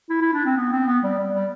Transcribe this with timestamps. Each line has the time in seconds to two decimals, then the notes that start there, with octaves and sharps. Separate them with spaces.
0.10 E4
0.21 E4
0.33 D4
0.45 C4
0.57 B3
0.72 C4
0.87 B3
1.04 G3
1.18 G3
1.34 G3